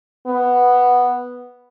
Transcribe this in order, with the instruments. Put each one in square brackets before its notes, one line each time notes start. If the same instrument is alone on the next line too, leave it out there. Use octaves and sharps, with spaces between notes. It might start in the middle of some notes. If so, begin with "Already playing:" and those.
[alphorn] B3